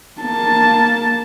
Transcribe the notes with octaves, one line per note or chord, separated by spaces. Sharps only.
A#3 A5